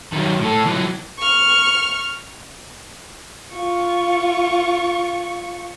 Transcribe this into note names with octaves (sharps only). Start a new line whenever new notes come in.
D#3 F#3
A2 A4
E3 F#3
C#6 F6
F4 C#6